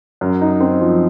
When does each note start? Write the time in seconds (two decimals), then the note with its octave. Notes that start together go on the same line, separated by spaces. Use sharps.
0.21 F#2
0.41 D#4
0.60 C4
0.81 F3